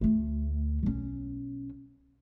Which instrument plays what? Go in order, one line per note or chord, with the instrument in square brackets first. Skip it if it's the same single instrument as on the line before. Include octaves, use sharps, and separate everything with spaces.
[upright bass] D2 A3
B1 C#4